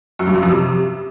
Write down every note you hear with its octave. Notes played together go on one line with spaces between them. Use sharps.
F#2
G2
F#2
F2
C3